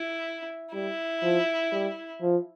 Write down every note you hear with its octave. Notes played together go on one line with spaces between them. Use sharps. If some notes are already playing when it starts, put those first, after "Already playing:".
Already playing: E4
G3 E4
F3
G3
F3